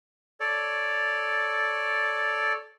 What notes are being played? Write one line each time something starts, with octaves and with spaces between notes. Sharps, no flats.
A4 C#5 D5